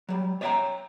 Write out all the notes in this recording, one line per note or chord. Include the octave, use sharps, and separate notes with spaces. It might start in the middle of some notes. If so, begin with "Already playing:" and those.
F#3 G3
C#5 D#5 E5 F#5 G5 A#5